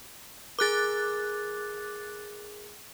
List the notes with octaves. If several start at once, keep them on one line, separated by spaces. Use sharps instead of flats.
G#4 A#4 D6 F#6 A6